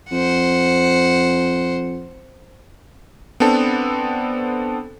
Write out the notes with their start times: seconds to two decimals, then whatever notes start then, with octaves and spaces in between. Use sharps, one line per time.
0.12 F2 C5 F#5
3.40 B3 C4 D4 A4